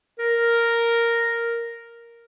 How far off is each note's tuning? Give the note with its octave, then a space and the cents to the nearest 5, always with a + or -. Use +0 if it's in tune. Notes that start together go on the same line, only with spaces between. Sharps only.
A#4 +0